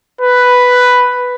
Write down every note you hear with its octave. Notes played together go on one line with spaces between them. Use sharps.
B4